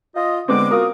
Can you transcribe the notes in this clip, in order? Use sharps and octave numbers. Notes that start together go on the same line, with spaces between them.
F4 D#5
D3 G#3 B3 C4 D6
F4 F#4 A#4 D#6